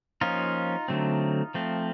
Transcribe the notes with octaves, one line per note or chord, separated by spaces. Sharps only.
F3 A#3 C#4 D#4 F4
D3 F#3 A3 C4
F3 A3 C4